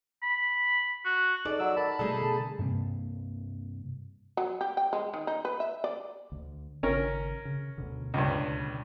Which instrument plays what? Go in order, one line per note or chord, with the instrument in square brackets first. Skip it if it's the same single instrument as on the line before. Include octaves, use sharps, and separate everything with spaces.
[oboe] B5
F#4
[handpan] D#4 G#4 A4 [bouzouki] D5
[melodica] F#3 E6
[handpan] A#4 [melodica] A5 B5
[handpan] B2 G3 A3 [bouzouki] D#4 G#4 A4
[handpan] D3
[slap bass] G2 C3 A#3
[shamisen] F#3
G4
G5
G#3
D#3
D#4
B4
E5
D5
[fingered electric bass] D2
[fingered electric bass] G#1 C#3 [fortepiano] C#4 A#4
[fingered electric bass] C#3
D2 B2 D3
[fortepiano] C#2 G2